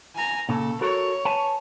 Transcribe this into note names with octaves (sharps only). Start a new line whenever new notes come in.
G#5 A#5
A#2 C#3 A4
F#4 A4 A#4 C#5
B4 G#5 A5